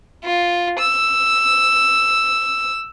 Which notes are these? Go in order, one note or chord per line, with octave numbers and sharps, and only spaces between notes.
F4
E6